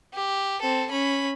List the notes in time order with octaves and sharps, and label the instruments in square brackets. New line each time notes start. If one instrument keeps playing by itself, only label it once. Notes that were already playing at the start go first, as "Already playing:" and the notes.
[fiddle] G4
C4 A4
C#4 B5